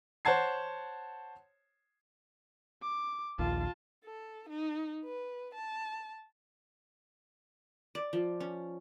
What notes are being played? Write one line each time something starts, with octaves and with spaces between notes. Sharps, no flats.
C5 C#5 F#5 A5 G#6 C7
D6
A#1 D#2 F4 A5
A4
D#4
B4
A5
D5
F3
C#4